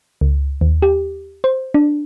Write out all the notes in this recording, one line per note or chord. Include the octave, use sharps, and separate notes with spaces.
C#2
D#2
G4
C5
D4